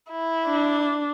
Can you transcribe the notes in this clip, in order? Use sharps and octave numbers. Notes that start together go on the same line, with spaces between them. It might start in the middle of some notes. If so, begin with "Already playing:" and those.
E4
D4